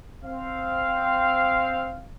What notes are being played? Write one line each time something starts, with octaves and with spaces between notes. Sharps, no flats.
C4 F5